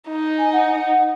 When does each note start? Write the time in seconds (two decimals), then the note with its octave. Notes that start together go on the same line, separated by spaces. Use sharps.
0.08 D#4
0.38 G#5
0.52 F#5